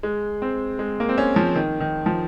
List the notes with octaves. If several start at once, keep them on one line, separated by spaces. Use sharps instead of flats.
G#3
C4
G#3
A#3
C4
C#4
F3
D#3
D#3
F3